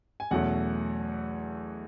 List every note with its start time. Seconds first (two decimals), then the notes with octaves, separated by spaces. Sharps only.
0.20 G#5
0.31 E2 B2 F#3 A3 C#4 F#5